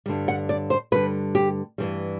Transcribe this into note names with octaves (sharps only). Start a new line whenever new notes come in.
G2 D3 G3
F#5
D5
C5
G2 D3 G3 B4
G4
G2 E3 G3